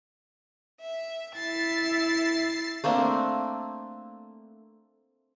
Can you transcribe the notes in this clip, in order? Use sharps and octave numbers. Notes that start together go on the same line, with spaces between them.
E5
E4 E5 A6 C7
A3 A#3 C4 D4